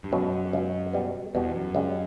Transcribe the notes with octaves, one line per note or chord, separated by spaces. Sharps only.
G2
C#2 F#2 B2 F#3
C#2 B2 F#3
B2 G3 B3
E2 B2 G3 B3
F#2
C#2 C#3 G3